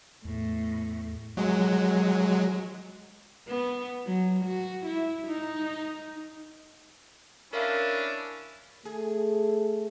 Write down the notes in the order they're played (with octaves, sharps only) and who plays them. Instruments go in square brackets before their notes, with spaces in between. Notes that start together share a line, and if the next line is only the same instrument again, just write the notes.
[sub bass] E2 [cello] A2
[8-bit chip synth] F#3 G#3
[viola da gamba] B3
F#3
F#4
E4
D#4
[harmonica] C#4 D4 E4 [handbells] A#4 E5 F5
[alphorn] A3 [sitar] G#4